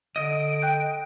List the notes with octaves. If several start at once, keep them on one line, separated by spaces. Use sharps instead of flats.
D3 D#5 D7
G5 F#6 G6